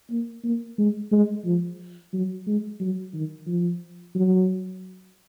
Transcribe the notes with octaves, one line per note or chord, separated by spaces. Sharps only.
A#3
A#3
G#3
G#3
F3
F#3
G#3
F#3
D#3
F3
F#3